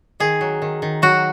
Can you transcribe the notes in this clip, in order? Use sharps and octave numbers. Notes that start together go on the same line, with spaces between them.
D#3 G#4
F#3
D#3
D#3
F#3 F#4